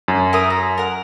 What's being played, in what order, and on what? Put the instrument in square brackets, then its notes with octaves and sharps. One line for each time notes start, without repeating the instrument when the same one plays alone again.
[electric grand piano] F#2
[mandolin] E4 A#4 D#6
A#5
A#4 F#5